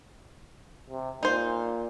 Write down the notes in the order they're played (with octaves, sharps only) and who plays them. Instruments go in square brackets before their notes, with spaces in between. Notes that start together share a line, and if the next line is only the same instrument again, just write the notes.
[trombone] C3
[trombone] A#2 [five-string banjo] D#4 C5